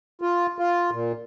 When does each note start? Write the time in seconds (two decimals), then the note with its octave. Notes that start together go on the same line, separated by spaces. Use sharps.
0.22 F4
0.59 F4
0.91 A#2